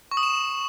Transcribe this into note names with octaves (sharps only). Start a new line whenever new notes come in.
C#6
D#6
E7